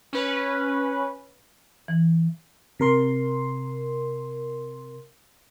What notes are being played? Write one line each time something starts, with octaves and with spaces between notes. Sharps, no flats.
C#4 B4
E3
C3 A#4 C6